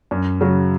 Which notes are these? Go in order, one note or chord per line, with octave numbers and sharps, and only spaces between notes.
F#2
C#3 F#3